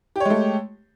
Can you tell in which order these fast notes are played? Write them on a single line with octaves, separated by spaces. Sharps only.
G4 C#5 G#3 A3